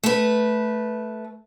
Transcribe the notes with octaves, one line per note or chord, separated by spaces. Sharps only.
A3 B4